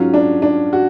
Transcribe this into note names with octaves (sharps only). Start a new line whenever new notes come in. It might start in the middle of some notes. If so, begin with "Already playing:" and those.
Already playing: G#2 F#3 C#4 F4
D4
D4
F#4